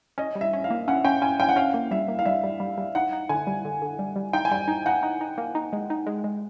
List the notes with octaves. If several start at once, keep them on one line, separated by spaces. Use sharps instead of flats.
C#4 D#5
G3
E5
C#4
F5
A#3
C#4 F#5
C#4 G5
C#4 G#5
C#4 G5
F#5
C#4 F5
A#3
G3 E5
A#3
F5
G3 E5
G3
G3
G3
D#4 F#5
D#4
D3 G#5
G3
D3
D3
G3
G3
D#4 G5
G#5
G3 G5
D#4
D#4 F#5
D#4
D#4
A#3
D#4
G#3
D#4
G#3
G#3